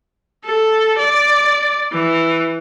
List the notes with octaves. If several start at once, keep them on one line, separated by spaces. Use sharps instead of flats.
A4
D5
E3